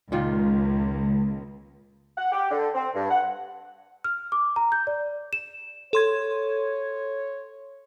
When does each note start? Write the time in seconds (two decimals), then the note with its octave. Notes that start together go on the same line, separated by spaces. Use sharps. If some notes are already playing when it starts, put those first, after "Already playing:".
0.12 C#2 A#2 D#3 F4
2.18 F#5
2.32 G4
2.51 D3
2.75 C4
2.95 G2
3.11 F#5
4.04 F6
4.32 D6
4.56 A#5
4.72 G6
4.87 D5
5.33 E7
5.93 A4 C#5 C6 G#6